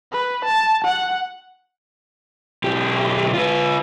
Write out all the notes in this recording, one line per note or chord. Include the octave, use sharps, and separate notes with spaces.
B4
A5
F#5
B1 G4
F4 B4